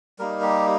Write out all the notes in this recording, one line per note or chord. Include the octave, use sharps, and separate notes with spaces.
G3 A#3 D#4 A#4
G4